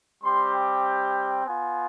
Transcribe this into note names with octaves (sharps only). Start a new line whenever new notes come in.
G3 C4 G4 C6
G5
B3 F4 G#5